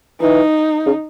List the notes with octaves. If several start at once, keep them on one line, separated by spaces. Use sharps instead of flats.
E3 D#4
C#3